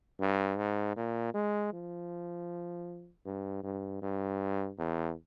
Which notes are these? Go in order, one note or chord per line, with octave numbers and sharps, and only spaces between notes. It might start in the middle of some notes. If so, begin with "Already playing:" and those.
G2
G#2
A#2
G#3
F3
G2
G2
G2
E2